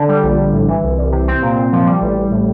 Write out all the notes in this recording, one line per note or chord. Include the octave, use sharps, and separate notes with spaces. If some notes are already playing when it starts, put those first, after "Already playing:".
Already playing: D3
G3
A#1
A#1
A2
E3
C2
C2
C3
C4
A#2
A#2
F3
G3
A1
A1
A2